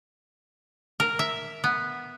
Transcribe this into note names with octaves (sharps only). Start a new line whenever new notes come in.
A#4
E5
B3